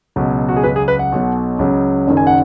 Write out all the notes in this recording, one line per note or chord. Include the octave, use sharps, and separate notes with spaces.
C#2 B2 F#3
F#4
G#4
C#2 C#3 F#3 B4
G#4
B4
F#5
B1 B2 F#3
C#2 C#3 F#3
F#1 F#2 D#3
G#5
F#5